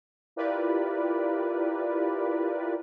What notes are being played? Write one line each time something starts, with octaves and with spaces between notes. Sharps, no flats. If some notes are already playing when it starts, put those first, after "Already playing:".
E4 F4 G4 A#4 B4 D5